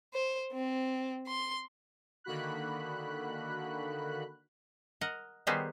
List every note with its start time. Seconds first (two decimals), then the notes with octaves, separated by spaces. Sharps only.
0.14 C5
0.52 C4
1.27 C6
2.24 D3 D#3 A#3 F#4 B5 F#6
5.01 A#4 D#5 F#5
5.47 D#3 G3 B3 D#4 G#4 C5